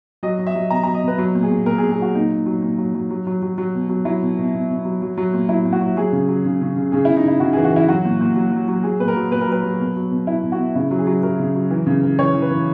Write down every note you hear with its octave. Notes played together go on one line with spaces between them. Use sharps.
F#3 D#5
F#3
E5
F#3
B2 A#5
F#3 A#5
D#5
B2 B4
F#3
A#2
G#4
A#2
A#2 A#4
G#4
A#2
G#4
F#3 F#4
A#2 D#4
A#2
F#3
A#2
F#3
F#3
F#3
F#3
F#3
F#3
B2
F#3
F#3 E4
B2
B2
B2
B2
F#3
F#3
F#3
A#2
F#3 E4
A#2
F#4
F#3
F#3 G#4
C#3
F#3
C#3
C#3
C#3
C#3 G#4
C#3 E4
D#4
C#3 E4
C#3 F#4
E3 G#4
F#4
E3 E4
F#3 F#4
A#2
A#2
F#3
F#3
F#3
F#3 G#4
A#2 B4
A#4
F#3
A#2 B4
A#4
F#3 B4
F#3
B2
F#3
B2
B2 E4
B2
F#4
B2
C#3 E4
F#3
G#4
F#3
F#3 A#4
C#3
F#3
E3
C#3
E3
E3 C#5
E3
B4
E3